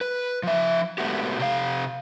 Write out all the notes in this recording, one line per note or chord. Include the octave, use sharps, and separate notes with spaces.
B4
F3 E5
G#3 A3 B3 F#4 G4
C3 G4 C5 F5